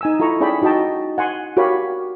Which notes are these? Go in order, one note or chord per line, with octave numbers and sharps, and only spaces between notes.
D#4 G#5 E6
E4 F4 A4 A#5 C#6
C#4 G#4 D5 E5 G5 B5
D#4 F#4 D#5 G5 A5
F#5 G#5 C6
F#4 G4 A#4 C#5 F5 B5